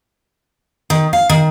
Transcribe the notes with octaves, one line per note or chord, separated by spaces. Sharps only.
D#3
F5
D#3